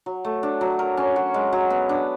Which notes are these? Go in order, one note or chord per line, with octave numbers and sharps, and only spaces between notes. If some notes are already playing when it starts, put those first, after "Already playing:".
F#3
A3
D4
F#3
A#4
C#4
F#4
G#3
F#3
B3
D4